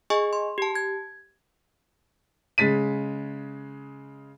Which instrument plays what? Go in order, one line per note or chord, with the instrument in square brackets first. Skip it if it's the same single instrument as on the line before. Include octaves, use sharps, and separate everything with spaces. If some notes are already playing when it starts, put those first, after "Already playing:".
[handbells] G#4 D#5 G#5 C#6
C6
G4 A5
G#6
[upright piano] C#3 G#3 A6 B6 D#7